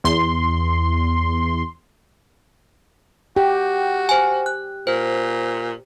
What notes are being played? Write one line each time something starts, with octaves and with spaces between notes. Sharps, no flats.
E2 C6
F#4 G4
C5 G#5
F#6
A#2 C5